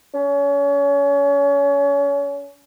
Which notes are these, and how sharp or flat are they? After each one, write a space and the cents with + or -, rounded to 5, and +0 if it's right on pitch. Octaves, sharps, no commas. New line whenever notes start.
C#4 +30